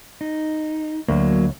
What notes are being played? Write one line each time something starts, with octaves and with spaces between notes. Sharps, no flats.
D#4
D2 F#3 A#3